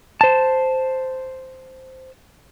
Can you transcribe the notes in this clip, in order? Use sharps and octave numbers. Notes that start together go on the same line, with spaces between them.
C5 A5